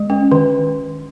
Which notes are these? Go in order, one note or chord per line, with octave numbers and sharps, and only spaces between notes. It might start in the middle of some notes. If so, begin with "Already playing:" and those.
Already playing: G#3
C#4
D#3